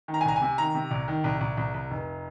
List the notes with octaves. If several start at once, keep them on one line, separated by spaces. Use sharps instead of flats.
D#3
A#5
G#5
C2 A#5
G#5
C3
D#3 A#5
C3
C2
D#3
C2
C2
C2
C2
F1